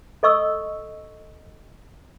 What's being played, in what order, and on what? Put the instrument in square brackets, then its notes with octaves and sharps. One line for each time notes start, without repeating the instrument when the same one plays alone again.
[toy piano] A4 D#5 C#6 E6